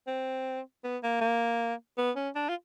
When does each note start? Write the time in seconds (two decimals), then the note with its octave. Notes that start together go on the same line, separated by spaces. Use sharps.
0.07 C4
0.84 B3
1.03 A#3
1.21 A#3
1.98 B3
2.16 C#4
2.36 D4
2.49 F4